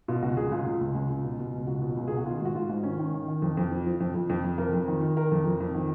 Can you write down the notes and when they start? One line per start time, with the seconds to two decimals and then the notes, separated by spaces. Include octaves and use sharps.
0.08 B2 F4
0.22 C#2 F#4
0.36 C#2 G#4
0.51 C#2 F4
0.66 C#2
0.81 C#2
0.95 C#2
1.10 C#2
1.24 B2
1.39 B2
1.54 C#2
1.67 C#2 F#4
1.82 B2
1.97 C#2
2.07 B2 G#4
2.17 F#4
2.25 D#3 F4
2.41 G#2 F#4
2.55 G#2 F4
2.70 G#2
2.83 D#3 C#4
2.99 D#3
3.14 D#3
3.28 D#3
3.42 F2
3.57 F2
3.70 F3
3.86 F3
4.00 F2
4.15 F2
4.29 F2
4.44 F2
4.58 F2 A#4
4.73 F2
4.88 D#3
5.01 D#3
5.16 D#3 A#4
5.32 F2
5.45 F2
5.60 F2
5.74 D#3